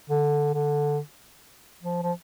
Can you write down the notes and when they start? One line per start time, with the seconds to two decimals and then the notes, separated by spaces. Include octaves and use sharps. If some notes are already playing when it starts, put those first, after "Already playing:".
0.10 D3
0.54 D3
1.83 F3
2.03 F3